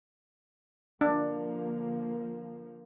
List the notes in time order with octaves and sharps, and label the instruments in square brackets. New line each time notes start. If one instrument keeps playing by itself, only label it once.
[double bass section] D3 F3 A#3 [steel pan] D4